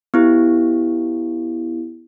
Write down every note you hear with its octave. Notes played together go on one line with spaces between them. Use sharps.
B3 E4 G4